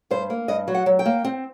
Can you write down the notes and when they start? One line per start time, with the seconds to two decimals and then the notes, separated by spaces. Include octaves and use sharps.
0.11 G2 C5
0.30 A#3
0.48 G2 D#5
0.68 F#3
0.74 F#5
0.86 F#3
0.99 G5
1.06 A#3
1.25 C4